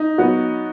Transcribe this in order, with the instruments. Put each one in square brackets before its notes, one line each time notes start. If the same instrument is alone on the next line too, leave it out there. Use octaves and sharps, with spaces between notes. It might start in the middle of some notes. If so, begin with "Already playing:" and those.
Already playing: [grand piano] D#4
[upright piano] F#3 B3 F#4